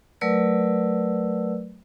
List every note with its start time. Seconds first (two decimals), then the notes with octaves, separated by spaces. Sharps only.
0.21 F#3 A3 A#4 B4 D5 E6